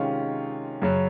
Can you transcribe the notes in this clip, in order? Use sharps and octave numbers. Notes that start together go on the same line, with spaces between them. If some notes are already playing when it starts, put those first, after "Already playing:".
Already playing: C3 D#3 G#3 C#4 F4
F#2 C#3 F#3